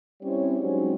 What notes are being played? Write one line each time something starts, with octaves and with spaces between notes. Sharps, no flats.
G3 C4 C#4 E4 C#5
F#3 G#3 C4 C#4 D#4